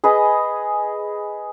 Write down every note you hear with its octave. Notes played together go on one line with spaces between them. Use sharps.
G#4 B4 D#5